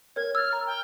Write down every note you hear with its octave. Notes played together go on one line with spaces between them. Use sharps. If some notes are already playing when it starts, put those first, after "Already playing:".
A#4 C#5 G#6
E6 F6 A6
A#5
G5